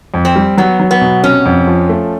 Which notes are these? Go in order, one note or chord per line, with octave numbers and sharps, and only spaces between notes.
F2
C4
G3
F#3 B3
F#3
B3
B2
C3 C#4
F2
F3
A3